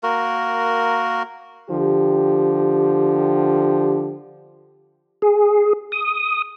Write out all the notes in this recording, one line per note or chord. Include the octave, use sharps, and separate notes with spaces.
A#3 F#4 A#4
D3 F3 G4
G#4
D#6